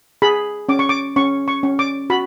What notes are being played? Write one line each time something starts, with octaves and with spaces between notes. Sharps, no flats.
G#4 B5
C#4 D6
C#6
D6
C#4 C#6
C#6
C#4
D6
F#4 B5